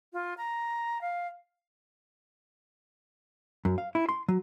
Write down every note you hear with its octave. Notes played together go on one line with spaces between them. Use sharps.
F4
A#5
F5
F#2
F5
E4
C6
F#3